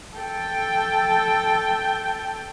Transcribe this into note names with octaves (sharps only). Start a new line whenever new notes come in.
A4 G5